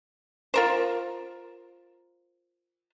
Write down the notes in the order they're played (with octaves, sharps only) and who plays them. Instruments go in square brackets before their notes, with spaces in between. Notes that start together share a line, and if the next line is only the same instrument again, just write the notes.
[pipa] F4 A#4 C5